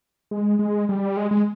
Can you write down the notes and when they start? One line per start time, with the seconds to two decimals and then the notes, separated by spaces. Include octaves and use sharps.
0.31 G#3
0.59 G#3
0.89 G3
1.17 G#3
1.31 G#3